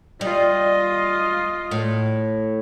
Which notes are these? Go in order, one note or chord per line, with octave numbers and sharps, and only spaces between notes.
G3 F4 D#5
A2